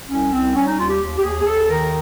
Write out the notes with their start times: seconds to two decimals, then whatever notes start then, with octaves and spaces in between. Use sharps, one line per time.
0.09 C2 C#4
0.31 C2 C4
0.54 G3 C#4
0.66 D#4
0.77 D#2 F4
0.88 G4
1.00 D#2
1.17 G4
1.23 D#2 G#4
1.40 G#4
1.45 D#2 A4
1.67 D#3 A#4